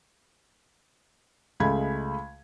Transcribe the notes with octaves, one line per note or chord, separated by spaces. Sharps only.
C#2 G#3 A3 B5 G#6